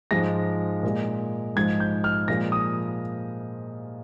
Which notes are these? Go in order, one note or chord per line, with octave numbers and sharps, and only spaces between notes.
G#2 F3 G#3 A#6
A#2 G#3
G#2 F3 G#3 G#6
G6
F6
A#2 F3 G#3 A#6
D#6